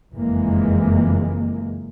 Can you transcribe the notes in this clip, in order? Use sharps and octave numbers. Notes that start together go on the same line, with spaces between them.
F#1 F2 E3 G#3 A#3